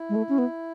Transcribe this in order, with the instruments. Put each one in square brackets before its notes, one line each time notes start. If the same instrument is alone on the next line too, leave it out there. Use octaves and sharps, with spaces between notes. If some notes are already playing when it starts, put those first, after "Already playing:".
Already playing: [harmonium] E4
[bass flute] G#3
A3
C#4
B3